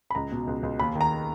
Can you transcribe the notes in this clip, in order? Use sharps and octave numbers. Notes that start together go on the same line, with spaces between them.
B5
C#2 A#5
B2
C#2
C#2
D#2 B5
D#3
A#5